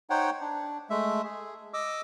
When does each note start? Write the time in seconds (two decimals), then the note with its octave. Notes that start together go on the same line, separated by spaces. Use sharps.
0.10 D#4 C5 C#5 F#5 G5
0.41 D4
0.90 G#3 A3 E5
1.24 G#4
1.74 D#5 D6 E6